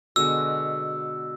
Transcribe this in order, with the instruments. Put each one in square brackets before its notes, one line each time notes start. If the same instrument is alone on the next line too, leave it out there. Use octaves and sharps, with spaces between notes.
[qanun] B2 D3 G#3 [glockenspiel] E6